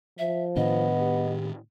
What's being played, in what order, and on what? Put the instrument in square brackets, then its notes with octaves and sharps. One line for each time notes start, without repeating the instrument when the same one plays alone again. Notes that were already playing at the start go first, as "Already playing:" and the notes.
[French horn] F3 [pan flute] E5
[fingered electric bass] A2 D#3 D4 [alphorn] B3 [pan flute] D#5
[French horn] G4